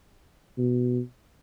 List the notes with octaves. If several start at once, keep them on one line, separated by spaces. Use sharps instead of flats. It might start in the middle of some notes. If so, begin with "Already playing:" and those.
B2